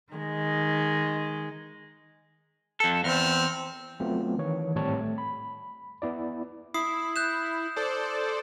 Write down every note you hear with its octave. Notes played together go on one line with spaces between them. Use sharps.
D#3 G#3
F2 A4
E2 C4 F6
F#3 A3 B3 C4 F4
D#3 E3 C#5
G#1 A2 G3 C4 C#5 A5
A3
B5
B3 E4 D5
E4 D#6 C7
F#6 G6 E7
A4 C5 D5